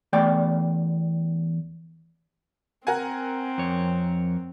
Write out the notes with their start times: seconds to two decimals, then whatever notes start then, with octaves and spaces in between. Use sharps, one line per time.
0.13 E2 A3 D5 G5
2.87 C4 A#4 F#5 G#5
3.58 F2 C#5